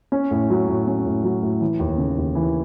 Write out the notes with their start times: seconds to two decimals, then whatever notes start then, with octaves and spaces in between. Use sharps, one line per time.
0.12 C#4
0.31 A2
0.50 F#3
0.69 A2
0.87 C#4
1.06 A2
1.24 F#3
1.43 A2
1.61 E3
1.79 D#2
1.98 C#3
2.18 D#2
2.35 E3